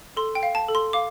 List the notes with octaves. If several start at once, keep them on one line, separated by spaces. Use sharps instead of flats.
A4 C6
G5
F5
A5
A4
C6
F5 D6